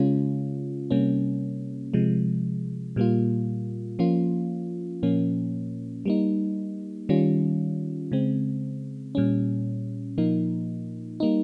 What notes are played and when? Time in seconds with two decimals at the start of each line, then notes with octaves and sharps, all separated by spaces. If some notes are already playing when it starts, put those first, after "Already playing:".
Already playing: C#3 G#3 C#4 F4
0.91 C3 G3 A#3 C#4
1.94 C3 F3 G#3
2.96 A#2 G3 A#3 F4
3.99 F3 A#3 C#4 F4
5.03 A#2 F3 A#3 C#4
6.06 G3 A#3 D#4
7.09 D#3 G3 C#4 F4
8.12 C#3 G#3 C4
9.15 A#2 G3 C#4
10.18 A#2 F3 A#3 D#4
11.20 G3 A#3 D#4